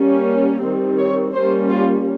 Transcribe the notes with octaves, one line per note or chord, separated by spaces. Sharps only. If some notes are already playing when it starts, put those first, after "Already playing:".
Already playing: G3 A#3 C#4
D#3 G3 C4
C#5
G3 A#3 C#4 C5
F4